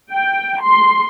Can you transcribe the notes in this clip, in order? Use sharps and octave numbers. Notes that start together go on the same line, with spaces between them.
G5
C6